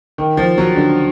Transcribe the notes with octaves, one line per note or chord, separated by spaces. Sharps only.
D#3
F3
F#3
D3